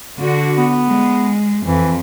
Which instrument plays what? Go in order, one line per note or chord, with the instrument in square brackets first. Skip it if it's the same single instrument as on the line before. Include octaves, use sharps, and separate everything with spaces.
[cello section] D3 F#4
[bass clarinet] B3
[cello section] G#3
[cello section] F2 [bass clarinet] E3